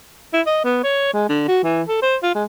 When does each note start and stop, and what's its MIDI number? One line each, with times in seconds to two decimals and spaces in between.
0.33 0.41 64
0.46 0.60 75
0.64 0.80 59
0.83 1.10 73
1.13 1.28 56
1.29 1.45 50
1.48 1.60 66
1.63 1.83 52
1.88 1.99 69
2.02 2.17 72
2.23 2.30 65
2.35 2.44 56